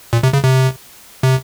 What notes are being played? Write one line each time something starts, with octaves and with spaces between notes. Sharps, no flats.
A#2
C3
C#3
C3
C3